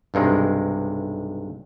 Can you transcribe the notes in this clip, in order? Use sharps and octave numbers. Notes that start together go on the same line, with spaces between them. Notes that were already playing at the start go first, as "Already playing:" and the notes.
B1 G2 C3 G#3